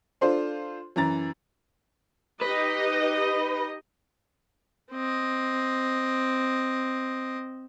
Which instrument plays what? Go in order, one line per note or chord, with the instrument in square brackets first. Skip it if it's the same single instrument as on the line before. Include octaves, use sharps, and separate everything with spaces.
[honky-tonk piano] D4 F4 A4 C5
F#2 E3 A#5 A6
[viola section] D#4 G4 D#5 [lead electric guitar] B4
[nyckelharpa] C4 D#5